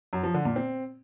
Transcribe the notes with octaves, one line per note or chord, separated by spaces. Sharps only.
F#2
F3
D3
A#2
C4